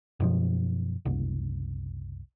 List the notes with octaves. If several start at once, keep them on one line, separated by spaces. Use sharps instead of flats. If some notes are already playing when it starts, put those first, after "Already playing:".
F#2 B2 F3
F#1 C2